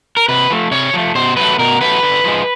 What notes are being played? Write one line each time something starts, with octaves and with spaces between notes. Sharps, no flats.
A#4
C3 B4
F3 A3
C3 C#5
F3 A3
B2 C5
F#3 A3 B4
B2 A#4
F#3 A3 B4
D3
F3 G#3